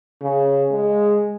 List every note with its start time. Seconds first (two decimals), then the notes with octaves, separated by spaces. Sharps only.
0.22 C#3
0.71 G#3